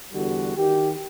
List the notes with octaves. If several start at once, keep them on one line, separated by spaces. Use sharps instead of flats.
E2 D3 G3 F#4
D#3 G4